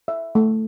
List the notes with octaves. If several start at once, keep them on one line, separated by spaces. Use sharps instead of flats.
E5
A3